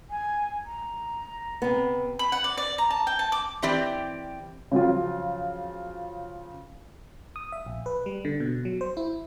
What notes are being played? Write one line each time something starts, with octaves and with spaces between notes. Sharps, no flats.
G#5
A#5
C3 B3
B5
F#5
D5
D5
A#5
A5
G5
A5
D6
E3 C4 G4 D5
C#3 F3 F#3 F4
D#6
E5
A#1
B4
G3
D3
B2
F#3
C5
E4